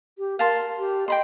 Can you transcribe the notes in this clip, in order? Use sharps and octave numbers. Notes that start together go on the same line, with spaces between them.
G4
A#4 F5 A5 C6
G4
D#5 G5 B5 C6